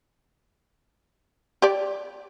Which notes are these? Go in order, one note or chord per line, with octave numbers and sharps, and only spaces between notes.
G4 D5